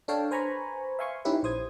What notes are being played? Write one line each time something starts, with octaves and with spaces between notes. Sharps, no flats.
D4 A4 C#5 F5 G5 A5
B4 C5 G#5 A#5 B5 C#6
E5 F5 G#5 C6 C#6
C#4 D#4 E4 G4 B4 E5
A#1 C5 D#6 G#6